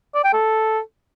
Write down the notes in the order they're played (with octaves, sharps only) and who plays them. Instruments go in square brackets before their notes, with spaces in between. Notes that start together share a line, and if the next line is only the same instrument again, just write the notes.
[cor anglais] D5
G5
A4